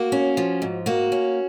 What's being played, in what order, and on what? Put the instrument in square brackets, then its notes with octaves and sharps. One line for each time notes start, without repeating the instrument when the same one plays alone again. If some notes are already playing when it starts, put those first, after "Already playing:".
Already playing: [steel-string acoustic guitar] A#3 F#4
C#4
F3
G#2
A#3 F#4
C#4